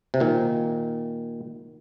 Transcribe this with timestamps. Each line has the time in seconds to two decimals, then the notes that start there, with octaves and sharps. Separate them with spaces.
0.14 C3
0.20 A#2 D#3